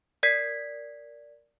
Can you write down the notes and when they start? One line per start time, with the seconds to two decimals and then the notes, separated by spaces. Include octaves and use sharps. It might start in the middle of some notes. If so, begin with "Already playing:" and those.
0.23 A#4 D5 G#6 B6 C7